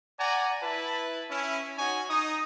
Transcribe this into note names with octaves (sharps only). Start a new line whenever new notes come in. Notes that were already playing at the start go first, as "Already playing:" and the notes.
D5 F#5 G#5 A#5
E4 B4 A5
C#4 E4
D#4 F#4 C#5 G#5
D#4 D#6